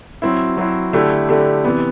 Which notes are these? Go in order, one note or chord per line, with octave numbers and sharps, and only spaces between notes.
F#3 C4 E4
F#3 C4 E4
D3 A3 E4 G4
D3 A3 E4 G4
C3 E3 B3